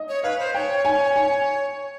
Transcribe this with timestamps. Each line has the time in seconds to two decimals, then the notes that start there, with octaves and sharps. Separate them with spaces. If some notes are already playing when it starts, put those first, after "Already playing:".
Already playing: D#5
0.09 C#5
0.23 B4 F5
0.39 C5
0.54 C#5 G5
0.85 G#5
1.16 G#5